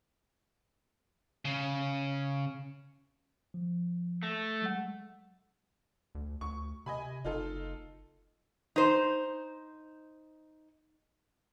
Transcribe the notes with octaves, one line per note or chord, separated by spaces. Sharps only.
C#3
F3
A3 A#6
F#3 G#3 F#5
D2
D2 C#6
C3 D#5 G#5 B5
F#1 D#4 F4 A4
D#4 C5